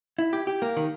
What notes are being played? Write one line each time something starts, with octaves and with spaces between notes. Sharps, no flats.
E4
G4
G4
A#3
D#3